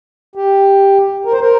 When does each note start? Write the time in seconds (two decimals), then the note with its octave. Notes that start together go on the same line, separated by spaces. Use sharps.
0.35 G4
1.25 A#4
1.32 C5
1.40 A#4